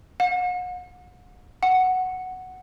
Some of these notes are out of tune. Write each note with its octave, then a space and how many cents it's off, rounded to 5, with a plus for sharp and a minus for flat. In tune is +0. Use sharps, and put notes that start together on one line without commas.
F#5 -40
F#5 +0